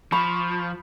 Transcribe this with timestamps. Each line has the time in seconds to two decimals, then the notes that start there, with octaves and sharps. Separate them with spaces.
0.12 F3 B5 C#6